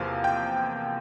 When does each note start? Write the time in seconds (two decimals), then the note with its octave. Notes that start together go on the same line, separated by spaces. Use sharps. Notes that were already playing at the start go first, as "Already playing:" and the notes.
Already playing: E2 C3 F3 A#3 F5
0.24 G5